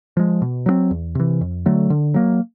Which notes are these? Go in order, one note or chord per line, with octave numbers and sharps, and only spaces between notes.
F3 G#3
B2
F#3 A3 C4
E2
C3 E3
F2
D3 F#3 A3
D3
F#3 A#3